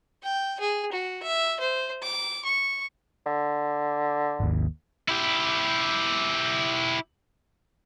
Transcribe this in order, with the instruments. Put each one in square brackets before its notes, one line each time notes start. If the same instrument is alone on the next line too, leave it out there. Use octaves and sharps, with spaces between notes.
[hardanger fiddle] G5
G#4
F#4
E5
C5
D6
C#6
[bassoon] D3
[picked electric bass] G#1 D#2
[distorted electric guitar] E4 G4